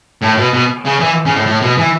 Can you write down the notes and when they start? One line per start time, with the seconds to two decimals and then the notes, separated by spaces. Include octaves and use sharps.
0.22 A2
0.37 B2
0.53 B2
0.85 C#3
1.00 E3
1.26 C#3
1.36 A2
1.47 A2
1.62 B2
1.78 E3